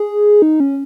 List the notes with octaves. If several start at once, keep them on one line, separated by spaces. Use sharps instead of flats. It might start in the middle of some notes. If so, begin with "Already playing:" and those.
Already playing: G#4
D#4
C#4